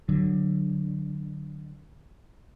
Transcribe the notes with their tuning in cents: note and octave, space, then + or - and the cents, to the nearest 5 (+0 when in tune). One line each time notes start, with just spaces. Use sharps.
D3 +10 F#3 +0